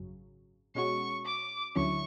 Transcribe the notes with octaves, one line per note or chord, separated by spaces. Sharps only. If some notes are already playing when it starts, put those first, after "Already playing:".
Already playing: G#1 F#2 C#3 F#3
B2 G#3 C#4 F#4 C#6
D6
D2 D3 F#3 C#4 E4 C#6